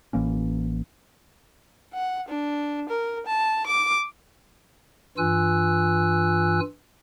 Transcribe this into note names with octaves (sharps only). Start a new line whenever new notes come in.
A1 E3 A#3 C#4
F#5
D4
A#4
A5
D6
G2 E3 F4 G#5 E6 F#6